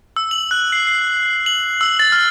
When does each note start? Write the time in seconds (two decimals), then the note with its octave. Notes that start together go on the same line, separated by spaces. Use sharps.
0.16 E6
0.31 F#7
0.51 F#6
0.72 C7
0.87 C7
1.46 F#7
1.81 E6
1.99 A6
2.12 F6